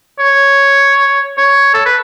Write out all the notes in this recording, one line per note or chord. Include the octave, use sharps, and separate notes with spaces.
C#5
C#5
A4
B4